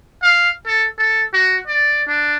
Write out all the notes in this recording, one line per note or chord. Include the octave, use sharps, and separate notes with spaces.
F5
A4
A4
F#4
D5
D4